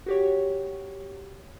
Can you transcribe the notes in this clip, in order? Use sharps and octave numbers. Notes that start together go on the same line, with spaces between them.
F#4 G4 C#5